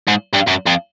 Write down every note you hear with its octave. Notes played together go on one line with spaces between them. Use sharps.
G#2
G2
F#2
F2